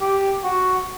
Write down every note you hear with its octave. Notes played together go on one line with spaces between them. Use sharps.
G4
F#4